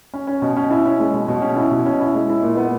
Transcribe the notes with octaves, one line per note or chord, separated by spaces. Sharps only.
C#4
C#4
B2
C#4
E4
C#4
G#3
B2
B2
C#4
E4
B2
C#4
E4
G#3
E4
A#2
B3